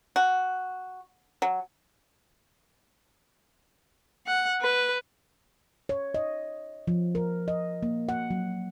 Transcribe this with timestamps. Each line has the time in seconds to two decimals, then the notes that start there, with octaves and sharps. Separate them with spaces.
0.16 F#4
1.42 F#3
4.26 F#5
4.62 B4
5.89 C#5
6.14 D#5
6.87 F3
7.15 A#4
7.48 D#5
7.83 A#3
8.09 F#5
8.30 F#3